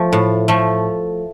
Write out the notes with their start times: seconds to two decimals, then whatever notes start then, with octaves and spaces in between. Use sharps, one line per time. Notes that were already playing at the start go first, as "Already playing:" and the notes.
Already playing: F3 A3
0.13 A2
0.48 F3 A3